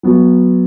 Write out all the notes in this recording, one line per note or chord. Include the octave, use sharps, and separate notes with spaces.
F#3 B3 F#4